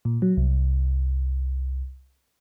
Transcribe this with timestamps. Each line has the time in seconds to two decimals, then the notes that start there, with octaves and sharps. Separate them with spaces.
0.05 A#2
0.22 F#3
0.37 C2